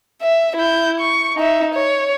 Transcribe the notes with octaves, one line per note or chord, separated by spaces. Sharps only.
E5
E4 G6
C#6
D#4 E5
C#5